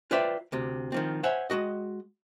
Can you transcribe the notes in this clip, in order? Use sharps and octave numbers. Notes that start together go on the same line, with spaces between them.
F4 B4 C5 D5 E5 G5
D2 C3
D#3 F3 C4
C5 C#5 E5 F#5 G#5
G#3 A#3 F#4 D#5